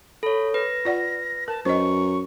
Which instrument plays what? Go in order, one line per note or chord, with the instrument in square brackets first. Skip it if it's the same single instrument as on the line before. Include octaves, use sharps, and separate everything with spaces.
[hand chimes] A4 C#5 [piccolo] B5
[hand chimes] B4 [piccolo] A#6
[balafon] F4 D5 F#5
[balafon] A#4 [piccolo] A5
[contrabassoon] F#2 [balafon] C5 D#5 [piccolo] C#6